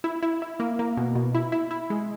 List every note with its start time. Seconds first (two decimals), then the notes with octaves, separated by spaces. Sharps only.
0.04 E4
0.22 E4
0.42 E4
0.60 A#3
0.79 A#3
0.97 B2
1.15 B2
1.34 E4
1.52 E4
1.71 E4
1.90 G#3